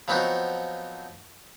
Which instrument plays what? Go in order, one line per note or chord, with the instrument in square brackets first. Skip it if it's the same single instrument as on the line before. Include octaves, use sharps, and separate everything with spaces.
[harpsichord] F3 F#3 B3 C4 D#4 F#4